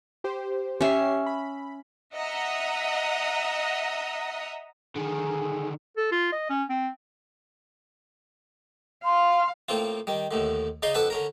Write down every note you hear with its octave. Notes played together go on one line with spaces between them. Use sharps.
G4 C5
C#4 G4 C#5 E5 C7
B5
D#5 E5 F#5 A#5 D#6 E6
D3 D#3 G#4
A4
F4
D#5
C#4
C4
F5 C6
A2 A#3 C4 F4
D#3 G3
D#2 A2 D3
C#3 D#4 D5 D#5 C6
F2 D4 A4 B4 F#5 B5
D3 C#4 A#4